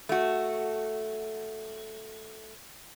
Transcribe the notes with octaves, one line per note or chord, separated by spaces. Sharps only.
A3 F#4